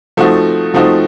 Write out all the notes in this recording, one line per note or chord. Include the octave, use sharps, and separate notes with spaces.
F3 A3 C4 D#4 F#4
F3 A3 C4 D#4 F#4